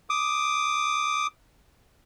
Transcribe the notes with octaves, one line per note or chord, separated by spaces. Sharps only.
D6 D#6